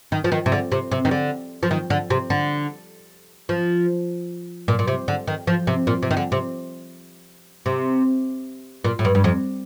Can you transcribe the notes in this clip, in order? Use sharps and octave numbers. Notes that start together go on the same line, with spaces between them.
D#3
F3
D#3
C3
D3
C3
C3
D#3
D3
F3
D#3
D3
C3
D3
F3
A#2
A#2
C3
D3
D#3
F3
C3
A#2
C3
D#3
D3
C3
C3
A#2
A2
G2
G2
F2